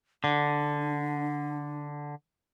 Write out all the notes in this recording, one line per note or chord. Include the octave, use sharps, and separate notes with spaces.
D3 D4